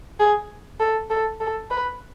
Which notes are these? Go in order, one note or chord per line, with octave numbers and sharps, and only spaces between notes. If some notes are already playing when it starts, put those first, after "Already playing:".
G#4
A4
A4
A4
B4